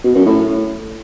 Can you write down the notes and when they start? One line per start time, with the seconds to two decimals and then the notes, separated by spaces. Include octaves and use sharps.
0.04 B2
0.15 F#2
0.26 A2